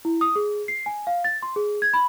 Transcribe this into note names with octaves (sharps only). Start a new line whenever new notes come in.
E4
D#6
G#4
C7
G#5
F5
A6
C6
G#4
G#6
B5